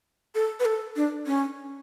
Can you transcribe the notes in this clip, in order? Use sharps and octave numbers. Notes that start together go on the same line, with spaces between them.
A4
B4
A4
D4
C#4